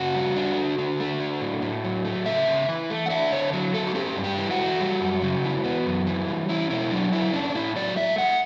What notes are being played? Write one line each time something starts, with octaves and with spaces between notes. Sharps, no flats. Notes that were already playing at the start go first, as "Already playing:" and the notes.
Already playing: C#3 F#4
G3
D4
D3
D3
A3
D4
A2
A2
F#3
A3
C#3 E5
C#3
E3
A3
F#5
D4 E5
D3 C#5
F#3
A3 A4
F#4
C#4 G4
G2
G4
E3
F#4
A3
G3
F#2
C#3
E3
B3
F#2
E3
G3
C#4 E4
B2 E4
F#3 D4
A3 E4
C#4 D4
A2 E4
F#3 D5
A3 E5
A2 F#5